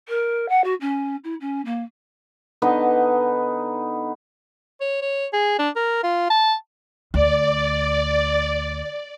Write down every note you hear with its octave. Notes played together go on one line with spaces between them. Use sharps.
A#4
F#5
F#4
C#4
E4
C#4
A#3
D3 B3 D#4 D#5
C#5
C#5
G#4
D4
A#4
F4
A5
D2 D5